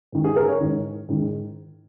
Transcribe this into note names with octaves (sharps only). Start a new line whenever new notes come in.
G#2 D#3
G#4
A#4
C#5
G#2 D#3
G#2 D#3